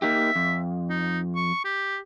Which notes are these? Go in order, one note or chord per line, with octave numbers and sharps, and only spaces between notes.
A#3 D#4 G4 E5
F2
D#4
C#6
G4